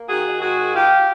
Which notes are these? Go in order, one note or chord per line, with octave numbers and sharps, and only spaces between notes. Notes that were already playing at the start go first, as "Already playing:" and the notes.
Already playing: A#3
D#3 F#4 G#4
D#3
G#2 F#4 G#4
D#3
G#2 F4 G4